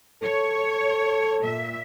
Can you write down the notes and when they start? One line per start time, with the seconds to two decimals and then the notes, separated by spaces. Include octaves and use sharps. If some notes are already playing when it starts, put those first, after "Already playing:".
0.23 A4 C#5
1.43 A#2 E5